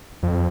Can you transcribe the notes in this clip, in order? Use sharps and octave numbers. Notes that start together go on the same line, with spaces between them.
F2